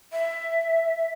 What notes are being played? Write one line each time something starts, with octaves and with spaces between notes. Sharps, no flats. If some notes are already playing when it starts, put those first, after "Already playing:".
E5